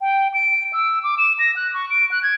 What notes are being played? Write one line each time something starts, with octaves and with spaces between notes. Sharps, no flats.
G5
D7
E6
D6
E7
A#6
F#6
C#6
D7
F#6
G#6